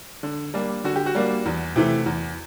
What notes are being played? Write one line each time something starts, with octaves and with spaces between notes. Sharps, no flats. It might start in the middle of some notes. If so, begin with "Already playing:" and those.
D3
G3 A#3 D4
D3 F#4
G4
F#4
G3 A#3 D4
E2
C3 E3 A3
E2